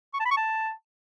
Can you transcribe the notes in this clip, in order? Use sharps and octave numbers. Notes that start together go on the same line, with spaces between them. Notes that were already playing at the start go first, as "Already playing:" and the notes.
C#6
A5
B5
C#6
A5